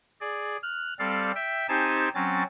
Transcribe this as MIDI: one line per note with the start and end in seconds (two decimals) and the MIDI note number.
0.21 0.57 68
0.21 0.57 74
0.63 0.94 89
0.63 0.94 90
0.99 1.32 55
0.99 1.32 60
0.99 1.32 69
0.99 1.32 74
0.99 1.32 77
1.35 1.67 76
1.35 1.67 79
1.69 2.09 60
1.69 2.09 63
1.69 2.09 67
1.69 2.09 72
1.69 2.09 80
1.69 2.09 81
2.15 2.43 54
2.15 2.43 60
2.15 2.43 61
2.15 2.43 93